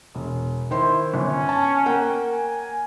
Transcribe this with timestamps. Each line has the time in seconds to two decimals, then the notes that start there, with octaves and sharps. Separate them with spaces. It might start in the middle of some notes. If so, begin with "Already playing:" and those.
0.15 E1
0.71 D#3 E4 C5 C6
1.14 G1 C#4
1.49 A5
1.86 A#3 F#5 G5
2.32 G#5